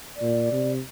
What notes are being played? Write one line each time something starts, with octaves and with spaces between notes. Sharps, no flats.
D5
A#2
C3